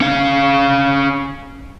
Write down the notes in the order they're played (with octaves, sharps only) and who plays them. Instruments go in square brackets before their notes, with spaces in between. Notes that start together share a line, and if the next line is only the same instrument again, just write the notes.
[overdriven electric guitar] C#4 F5